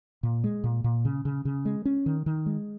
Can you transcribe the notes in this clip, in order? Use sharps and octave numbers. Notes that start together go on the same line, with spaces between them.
A#2
G#3
A#2
A#2
C#3
C#3
C#3
G#3
C#4
D#3
D#3
G#3